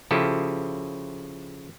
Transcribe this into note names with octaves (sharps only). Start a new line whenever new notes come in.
C#3 F3 E4 G4 A4